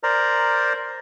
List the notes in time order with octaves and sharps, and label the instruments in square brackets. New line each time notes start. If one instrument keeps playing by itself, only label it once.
[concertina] A#4 C5 D5 A#5